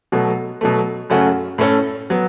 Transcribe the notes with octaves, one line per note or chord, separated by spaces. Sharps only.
B2 F#3 A3
B2 F#3 A3
F#2 C#3 A3 C#4 F#4
A2 A3 C#4 A4
F#3 B3